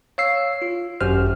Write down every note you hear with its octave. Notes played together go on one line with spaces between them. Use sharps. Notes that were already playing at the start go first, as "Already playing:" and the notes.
C#5 F5 E6 C7
F4
G#1 F#2 F#4 G4 C5 F6